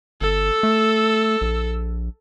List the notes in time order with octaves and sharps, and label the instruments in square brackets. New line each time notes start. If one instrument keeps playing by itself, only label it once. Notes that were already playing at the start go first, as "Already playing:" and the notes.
[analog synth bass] G1 [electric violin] A4 E6
[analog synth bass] A3
A#1